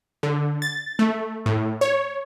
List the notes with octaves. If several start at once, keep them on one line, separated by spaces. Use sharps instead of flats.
D3
A6
A3
A2
C#5